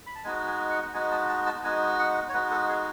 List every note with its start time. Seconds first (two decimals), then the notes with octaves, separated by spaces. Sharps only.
0.07 B5
0.15 A5
0.24 G#3 B3 D#4 F#4 G#5
0.47 G#5
0.70 F#5
0.94 G#3 B3 D#4 F#4 G#5
1.11 A5
1.29 A5
1.46 A5
1.64 G#3 B3 D#4 F#4 G#5
1.99 F#5
2.29 C#5
2.33 G#3 B3 D#4 F#4 B4
2.51 A4
2.69 G#4